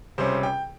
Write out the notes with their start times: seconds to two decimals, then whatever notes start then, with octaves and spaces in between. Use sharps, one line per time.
0.18 C#2 C3 G3 C#4 C5
0.43 G5